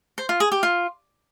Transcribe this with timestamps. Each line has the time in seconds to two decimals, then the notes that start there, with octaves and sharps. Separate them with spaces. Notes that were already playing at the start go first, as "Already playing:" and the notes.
0.18 C5
0.29 F4
0.40 G#4
0.52 G4
0.63 F4